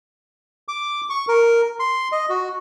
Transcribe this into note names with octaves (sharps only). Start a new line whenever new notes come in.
D6
C#6
A#4
C6
D#5
F#4